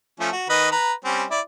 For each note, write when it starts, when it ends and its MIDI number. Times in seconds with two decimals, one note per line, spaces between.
0.20 0.30 53
0.20 0.30 57
0.20 0.30 61
0.32 0.47 66
0.49 0.71 51
0.49 0.71 71
0.49 0.71 75
0.72 0.93 71
0.72 0.93 82
1.05 1.24 55
1.05 1.24 60
1.05 1.24 61
1.30 1.40 64
1.30 1.40 74